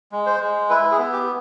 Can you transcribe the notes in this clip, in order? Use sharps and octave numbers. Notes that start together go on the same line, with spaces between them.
G#3
C5
G#3
E4 B4
G#4
B3
G4